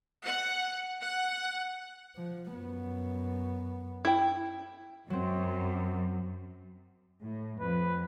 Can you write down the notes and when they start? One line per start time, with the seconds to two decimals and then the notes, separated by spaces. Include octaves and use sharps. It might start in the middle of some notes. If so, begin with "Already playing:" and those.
0.24 F#5
1.03 F#5
2.16 F3
2.53 F#2 B3
4.05 E4 G5
5.10 F#2 F#3 C4
7.22 A2
7.60 F2 B4